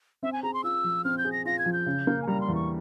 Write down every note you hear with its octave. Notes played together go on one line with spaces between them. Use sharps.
C4 E5
G#5
G#4 A#5
C6
F4 E6
F3
C4 F6
G6
G#4
A#6
F4 A#6
G#6
F3
G6
C#3
A#3
G#5
G3 A#5
C6
E2
C#6